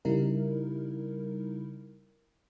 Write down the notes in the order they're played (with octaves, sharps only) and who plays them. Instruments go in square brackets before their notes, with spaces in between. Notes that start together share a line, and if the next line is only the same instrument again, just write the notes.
[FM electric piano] C#3 G3 D#4 E4 A#4